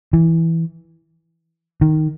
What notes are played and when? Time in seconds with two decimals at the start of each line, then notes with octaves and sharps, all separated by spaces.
0.13 E3
1.81 D#3